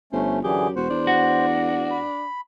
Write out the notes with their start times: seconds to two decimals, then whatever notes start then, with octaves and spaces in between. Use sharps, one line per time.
0.13 G1 A3 C#4 C5
0.44 F#2 D3 E3 G4 G#4
0.76 E1 F#4 C5
0.90 E2 D4
1.07 F#4
1.91 B5